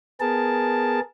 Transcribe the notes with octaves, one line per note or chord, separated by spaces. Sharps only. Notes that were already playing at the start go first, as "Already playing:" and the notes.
B3 G#4 A#4 A5